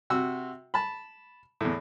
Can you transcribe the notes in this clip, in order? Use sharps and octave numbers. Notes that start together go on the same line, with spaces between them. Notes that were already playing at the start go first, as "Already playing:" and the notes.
C3 F#4 E6
A5 B5
E2 A2